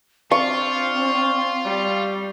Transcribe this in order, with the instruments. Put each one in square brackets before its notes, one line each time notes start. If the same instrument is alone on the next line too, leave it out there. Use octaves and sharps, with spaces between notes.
[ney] C4 [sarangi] D4 [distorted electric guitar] F4 [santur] C#6
[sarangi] G3